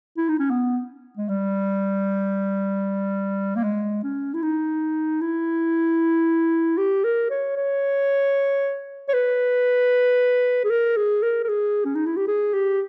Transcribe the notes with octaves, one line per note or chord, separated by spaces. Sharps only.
E4
D#4
C#4
B3
G#3
G3
A#3
G#3
C#4
E4
D#4
E4
G4
A#4
C#5
C#5
C#5
B4
G#4
A#4
G#4
A#4
A#4
G#4
C#4
D#4
E4
G4
G#4
G4